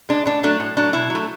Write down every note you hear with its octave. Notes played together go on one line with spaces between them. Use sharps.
G#3 D4
A2 D4
F#3 A3 D4
A2
F#3 A3 D4
B2 E4
F#3 A3